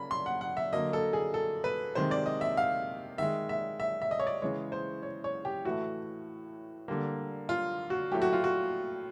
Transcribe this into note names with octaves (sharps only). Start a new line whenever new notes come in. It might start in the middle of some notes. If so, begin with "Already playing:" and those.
Already playing: C#3 A#3 B5
C6
F#5
F#5
E5
D3 F#3 A#3 D#5
A4
G#4
A4
B4
C3 D#3 G#3 C5
D5
D#5
E5
F5
D#3 G#3 E5
E5
E5
E5
D#5
C#5
D5
C#3 E3 G#3 C#5
C5
C#5
C#5
G4
A2 E3 A3 F#4
D3 G3 A#3
F4
F#4
A2 F#3 A3 G4
F#4
F4
F#4